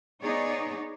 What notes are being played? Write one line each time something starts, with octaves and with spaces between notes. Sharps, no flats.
B3 D#4 G#4 C#5 D5